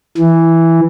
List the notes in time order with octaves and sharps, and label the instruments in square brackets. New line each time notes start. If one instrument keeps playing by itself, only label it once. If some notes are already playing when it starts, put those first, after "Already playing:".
[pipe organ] E3